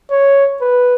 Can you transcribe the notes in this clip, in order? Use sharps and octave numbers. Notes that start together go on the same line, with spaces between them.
C#5
B4